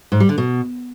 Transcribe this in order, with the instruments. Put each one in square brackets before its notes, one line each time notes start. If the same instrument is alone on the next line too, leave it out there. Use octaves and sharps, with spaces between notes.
[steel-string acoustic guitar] G#2
G3
D3
B2